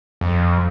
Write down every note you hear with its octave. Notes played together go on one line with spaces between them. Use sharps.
F2